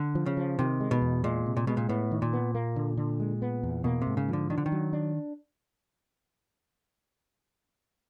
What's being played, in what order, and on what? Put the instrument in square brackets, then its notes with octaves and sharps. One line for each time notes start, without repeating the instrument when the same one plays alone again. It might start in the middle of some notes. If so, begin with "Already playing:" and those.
Already playing: [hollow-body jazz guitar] D3
[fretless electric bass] F3
[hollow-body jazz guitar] C#3
[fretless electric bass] F3
[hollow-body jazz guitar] C3 [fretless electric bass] D#3
[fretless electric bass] G#3
[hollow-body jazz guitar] B2
[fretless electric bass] E2
[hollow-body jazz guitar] A#2 [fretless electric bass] G#3
[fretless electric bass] C3
[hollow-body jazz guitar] A#2
[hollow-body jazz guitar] B2 [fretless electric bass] G#3
[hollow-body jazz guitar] A#2
[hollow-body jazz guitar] A2 [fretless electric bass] B3
[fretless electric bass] D#3
[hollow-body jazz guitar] A#2
[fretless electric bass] B3
A#3
D3
D3
G#3
B3
E2
[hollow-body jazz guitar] B2 [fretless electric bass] A#3
[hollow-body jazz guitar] C3
[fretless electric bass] G#2
[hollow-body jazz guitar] C#3
[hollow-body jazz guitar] D3 [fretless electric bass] F3
[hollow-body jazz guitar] D#3 [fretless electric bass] D4
[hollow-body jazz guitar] D3
D#3
[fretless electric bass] F#3
D4